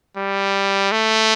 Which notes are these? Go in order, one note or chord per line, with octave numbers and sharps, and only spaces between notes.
G3
A3